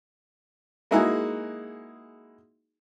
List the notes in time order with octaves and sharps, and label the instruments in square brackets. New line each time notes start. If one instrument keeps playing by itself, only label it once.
[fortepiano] G#3 A#3 D#4 E4 F#4 G#4